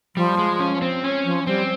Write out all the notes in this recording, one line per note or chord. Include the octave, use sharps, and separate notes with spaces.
F3 G3
G#3
C#4
C4
C#4
F3
G3 C4